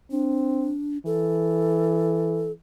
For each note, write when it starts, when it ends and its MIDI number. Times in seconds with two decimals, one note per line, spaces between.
0.11 0.71 60
0.11 0.98 62
1.06 2.54 52
1.06 2.51 69